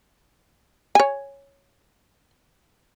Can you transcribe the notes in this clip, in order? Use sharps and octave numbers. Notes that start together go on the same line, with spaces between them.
C#5 G#5